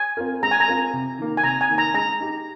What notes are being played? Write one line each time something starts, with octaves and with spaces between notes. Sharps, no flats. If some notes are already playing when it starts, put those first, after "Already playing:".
Already playing: G#5
C4 F4 A#4
G#3 A#5
G#5
A#5
C4 F4 A#4
C3
D#3 A#3
G#5
C3 A#5
G#5
D#3 A#3
A#5
G#3 A#5
D#4 G4